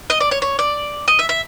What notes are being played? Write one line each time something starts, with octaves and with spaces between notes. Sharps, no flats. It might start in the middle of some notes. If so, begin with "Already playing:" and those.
D#5
D5
C#5
C#5
D5
D#5
E5
E5